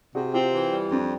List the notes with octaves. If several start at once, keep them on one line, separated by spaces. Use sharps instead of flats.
C3 F#4 G#4
C4 F4 G4
E3
G3
F2 C4 D4